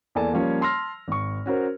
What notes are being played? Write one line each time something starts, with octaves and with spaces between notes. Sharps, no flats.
E2 A#3 A4 D5 G#5 A5
F3 G3 A#3 C#4 F4 C#5
A5 C6 E6 F6 A#6
G#1 C#6
C#4 F#4 A#4 C5